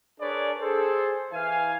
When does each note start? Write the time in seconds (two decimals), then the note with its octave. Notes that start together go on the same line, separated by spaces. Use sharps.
0.20 D4 G#4 A#4 B4 C#5 D5
0.59 G#4 A4 C5
1.32 E3 F5 G#5